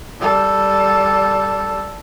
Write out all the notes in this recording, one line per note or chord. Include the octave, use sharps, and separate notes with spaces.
G3 A4